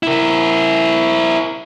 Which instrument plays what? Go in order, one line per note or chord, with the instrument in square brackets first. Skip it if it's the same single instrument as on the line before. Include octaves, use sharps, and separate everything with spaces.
[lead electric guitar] E4 A#4